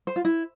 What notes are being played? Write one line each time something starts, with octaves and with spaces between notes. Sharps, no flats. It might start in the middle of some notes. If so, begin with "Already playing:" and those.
C5
F4
E4